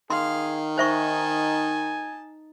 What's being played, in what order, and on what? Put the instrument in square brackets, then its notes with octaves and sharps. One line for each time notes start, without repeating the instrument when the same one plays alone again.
[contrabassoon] D#3 [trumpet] G#4 [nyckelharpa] F5 [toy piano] C6
[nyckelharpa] D#4 A5 [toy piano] C5 E5 C#6 [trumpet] G#5